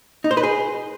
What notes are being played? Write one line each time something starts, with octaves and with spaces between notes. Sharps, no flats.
D#4
C5
B4
G#4